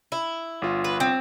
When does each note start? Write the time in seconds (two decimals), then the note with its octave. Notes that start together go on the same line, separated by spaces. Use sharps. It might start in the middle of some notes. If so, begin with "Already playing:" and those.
0.12 E4
0.62 G1 F4
0.84 B4
1.00 C4